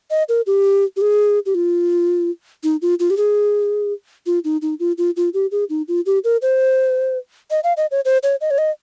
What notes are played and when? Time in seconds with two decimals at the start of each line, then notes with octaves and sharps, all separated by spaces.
0.10 D#5
0.29 A#4
0.47 G4
0.96 G4
1.01 G#4
1.46 G4
1.55 F4
2.64 D#4
2.82 F4
3.00 F4
3.10 G4
3.17 G#4
4.26 F4
4.44 D#4
4.62 D#4
4.80 F4
4.98 F4
5.17 F4
5.34 G4
5.52 G#4
5.69 D#4
5.88 F4
6.06 G4
6.24 A#4
6.42 C5
7.51 D#5
7.64 F5
7.77 D#5
7.91 C#5
8.05 C5
8.23 C#5
8.41 D#5
8.51 C#5
8.58 D#5